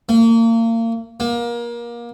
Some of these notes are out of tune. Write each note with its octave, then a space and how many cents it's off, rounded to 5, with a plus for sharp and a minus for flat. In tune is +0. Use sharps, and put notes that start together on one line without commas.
A#3 -35
A#3 +25